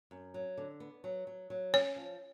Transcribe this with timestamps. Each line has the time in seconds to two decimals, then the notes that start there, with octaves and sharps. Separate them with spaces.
0.11 F#2
0.34 F#3
0.57 D3
0.80 B3
1.04 F#3
1.27 F#3
1.50 F#3
1.73 C#4 C#5
1.96 F3